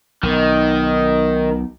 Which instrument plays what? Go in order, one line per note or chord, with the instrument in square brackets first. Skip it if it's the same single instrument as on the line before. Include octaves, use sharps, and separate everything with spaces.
[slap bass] B1 [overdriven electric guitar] D#3